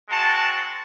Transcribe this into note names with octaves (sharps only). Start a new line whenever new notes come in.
G#3 C4 F#4 A5